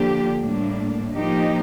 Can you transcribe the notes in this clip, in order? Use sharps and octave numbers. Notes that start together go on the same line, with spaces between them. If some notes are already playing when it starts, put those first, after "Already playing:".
Already playing: D3 F3 A#3 D4 G4
A2 G3 A#3 D4
F3 A#3 D#4 G4